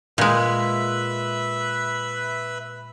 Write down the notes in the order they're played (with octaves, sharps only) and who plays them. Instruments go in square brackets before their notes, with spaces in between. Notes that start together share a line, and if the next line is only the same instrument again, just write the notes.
[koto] A#2 G#3 [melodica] B4 E5